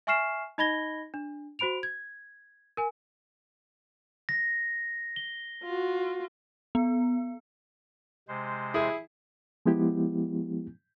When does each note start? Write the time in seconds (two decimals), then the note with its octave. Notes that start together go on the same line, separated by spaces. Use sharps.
0.07 E5 G#5 C#6 F6 C7 E7
0.58 D#4 D#5 B5 G#6 A#6 G7
1.14 D4
1.59 F#4 C5 B5 D7 F7
1.83 G#6
2.77 A#4 G#5
4.29 A#6
5.16 G7
5.63 F4 F#4
6.75 B3
8.28 C3 G#3 C5
8.74 E4 G#4
9.66 F3 G#3 B3 E4 G4